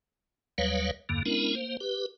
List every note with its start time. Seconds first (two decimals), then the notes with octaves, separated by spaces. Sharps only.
0.58 D#2 F#3 G3 B4 C#5 F5
1.09 E2 G2 D3 A#3
1.26 G#3 B3 C#4 D4 E4 A#4
1.55 A#3 C5
1.81 G4 B4